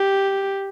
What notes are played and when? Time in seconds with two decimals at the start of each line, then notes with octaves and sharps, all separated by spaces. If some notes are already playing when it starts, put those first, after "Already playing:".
Already playing: G4